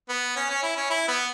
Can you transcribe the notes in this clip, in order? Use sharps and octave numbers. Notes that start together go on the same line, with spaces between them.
B3
C#4
C#4
E4
C#4
E4
B3